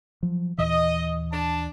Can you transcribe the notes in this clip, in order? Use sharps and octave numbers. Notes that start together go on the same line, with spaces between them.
F3 F#3
D#2 A#2 E3 D#5
D4 A5